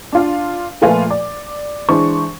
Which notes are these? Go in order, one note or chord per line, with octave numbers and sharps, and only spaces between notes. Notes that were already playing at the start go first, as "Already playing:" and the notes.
D4 F4 F5
A#2 F3 A3 F4 B4 G#5
D5
E3 G#3 D4 C5 C#6